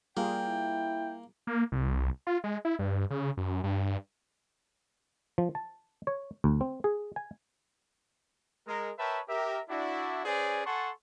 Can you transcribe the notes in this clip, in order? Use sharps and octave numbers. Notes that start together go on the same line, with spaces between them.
G3 A#3 F4 G#4 G5
E4
A#3
C2
F4
G#3
E4
G2
C#3
F#2
G2
F3
A5
C#5
D2
C4
G#4
G#5
G#3 A#4
A#4 B4 C#5 E5 G5 A5
G4 A#4 E5
D4 E4 F#4
C#4 G#4 B4 C5 D5 G#5
A4 F#5 G#5 A5 C6 C#6